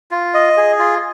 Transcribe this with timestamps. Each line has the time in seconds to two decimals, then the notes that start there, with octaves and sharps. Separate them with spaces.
0.11 F4
0.34 D#5
0.57 G#4
0.79 F4